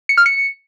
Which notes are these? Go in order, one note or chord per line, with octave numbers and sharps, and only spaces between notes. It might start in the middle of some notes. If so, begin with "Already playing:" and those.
C#7
F6
C#7